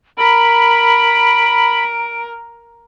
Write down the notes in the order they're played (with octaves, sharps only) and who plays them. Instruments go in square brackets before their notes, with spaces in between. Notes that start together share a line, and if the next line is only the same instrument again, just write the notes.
[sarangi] A#4 [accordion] B5 [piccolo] D7